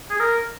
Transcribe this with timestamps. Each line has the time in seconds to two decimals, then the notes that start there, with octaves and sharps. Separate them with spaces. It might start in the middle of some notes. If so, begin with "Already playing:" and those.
0.10 G#4
0.20 A#4